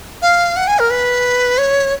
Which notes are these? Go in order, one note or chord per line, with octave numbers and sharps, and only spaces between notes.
F5
F#5
G#5
A#4
B4
C#5